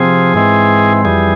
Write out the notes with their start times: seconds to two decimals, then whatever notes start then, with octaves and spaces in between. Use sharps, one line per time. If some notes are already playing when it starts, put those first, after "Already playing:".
Already playing: C3 F3 C4 G#4
0.34 G#2 E3 G#3 C4
1.05 F2 E3 G3 G#4